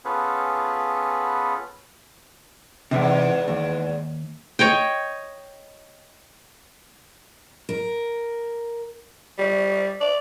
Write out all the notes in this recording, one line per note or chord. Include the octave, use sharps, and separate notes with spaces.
B3 C#4 F4 G#4 A4 B4
E2 G#2 C3 E3
D#2
C#5 D#5 G5
A#4
G3
D5